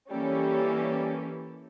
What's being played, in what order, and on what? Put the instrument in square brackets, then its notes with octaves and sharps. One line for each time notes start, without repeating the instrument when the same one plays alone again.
[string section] E3 C#4 [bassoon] G3 [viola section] A#3 G4 A4